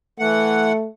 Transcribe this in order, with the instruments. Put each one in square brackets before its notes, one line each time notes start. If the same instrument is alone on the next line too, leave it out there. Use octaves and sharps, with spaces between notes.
[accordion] E3 F#5 [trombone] A3